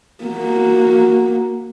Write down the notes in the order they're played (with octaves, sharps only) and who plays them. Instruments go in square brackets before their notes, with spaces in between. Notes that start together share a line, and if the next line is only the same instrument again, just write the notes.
[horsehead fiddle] A#3 F#4